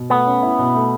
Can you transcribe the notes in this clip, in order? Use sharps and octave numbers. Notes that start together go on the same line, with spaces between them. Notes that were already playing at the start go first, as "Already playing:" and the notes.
Already playing: B2
A3 B3
C#4
E4
B2
A3